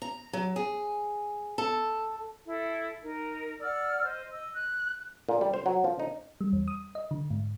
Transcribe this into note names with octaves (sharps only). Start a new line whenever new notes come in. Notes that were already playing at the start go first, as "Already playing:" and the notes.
A#5
F#3
G#4
A4
E4 A4
D#4 A#4
D5 F#5 E6 F6
C5 D#5
D#5 E6
F#6
A#2
G3
C5
F#3
F3
D#4
G3
E2
D#6
D#5
D3
G#2